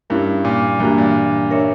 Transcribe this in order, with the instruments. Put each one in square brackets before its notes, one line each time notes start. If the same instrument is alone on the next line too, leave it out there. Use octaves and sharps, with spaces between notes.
[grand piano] G2 [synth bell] C#4 E4 A#4
[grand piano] A#2
[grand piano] G2 [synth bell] E3 G3 A#3 D4 F#4
[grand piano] A#2
[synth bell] D4 A#4 C#5 E5